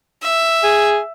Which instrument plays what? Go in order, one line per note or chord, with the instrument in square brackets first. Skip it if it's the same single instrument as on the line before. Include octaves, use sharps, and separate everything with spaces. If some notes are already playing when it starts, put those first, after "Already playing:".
[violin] E5
[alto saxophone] G#4